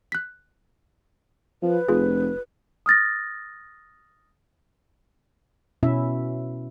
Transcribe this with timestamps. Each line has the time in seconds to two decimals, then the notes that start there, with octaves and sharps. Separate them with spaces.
0.12 F#6 B6
1.63 F3 B4
1.89 F1 F4 G#4
2.86 D#6 F6 A6 A#6
5.83 B2 C#4 E4 E5